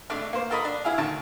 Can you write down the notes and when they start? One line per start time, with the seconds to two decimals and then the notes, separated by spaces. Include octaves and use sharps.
0.10 G#1 A3 D4 D5
0.33 A#3 C5
0.50 F4 A4 A#4 D#5 B5
0.64 D4
0.84 E4 F4 G#4 F5
0.98 D2 D#3 A5